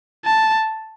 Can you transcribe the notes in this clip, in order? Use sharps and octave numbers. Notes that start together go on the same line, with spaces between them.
A5